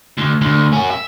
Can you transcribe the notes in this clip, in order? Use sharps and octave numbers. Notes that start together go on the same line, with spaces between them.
D2
D2
C#4 F#4
E5